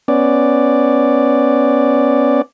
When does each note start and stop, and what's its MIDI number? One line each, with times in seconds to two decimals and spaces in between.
0.08 2.42 59
0.08 2.42 61
0.08 2.42 74